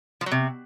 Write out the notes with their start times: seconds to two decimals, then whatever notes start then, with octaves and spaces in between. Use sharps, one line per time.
0.21 F3
0.26 F#3
0.31 C3